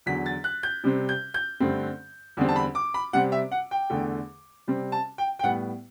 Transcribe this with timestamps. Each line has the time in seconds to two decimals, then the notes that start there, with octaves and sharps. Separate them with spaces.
0.06 E2 D3 F#3 B6
0.26 A6
0.44 F#6
0.63 G6
0.84 C3 G3 C4
1.09 G6
1.34 G6
1.60 G2 D3 A3 C4
2.37 E2 D3 G3 C4
2.48 A5
2.56 B5
2.75 D6
2.94 B5
3.13 C3 G3 C4 F#5
3.32 E5
3.52 F#5
3.71 G5
3.90 E2 D3 A3
4.68 C3 G3 C4
4.92 A5
5.18 G5
5.39 G5
5.43 A2 G3 B3 F#5